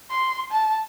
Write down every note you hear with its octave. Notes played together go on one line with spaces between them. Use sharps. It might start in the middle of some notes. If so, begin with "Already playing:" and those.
C6
A5